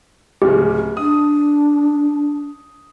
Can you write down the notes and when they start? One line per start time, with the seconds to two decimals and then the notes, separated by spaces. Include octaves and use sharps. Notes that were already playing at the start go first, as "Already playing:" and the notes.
0.42 D1 C#3 G4
0.97 D4 D#6